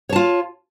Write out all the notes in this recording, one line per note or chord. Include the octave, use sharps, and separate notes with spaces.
F4 C#5 A5